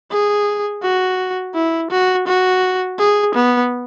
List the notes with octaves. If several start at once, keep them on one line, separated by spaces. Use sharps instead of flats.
G#4
F#4
E4
F#4
F#4
G#4
B3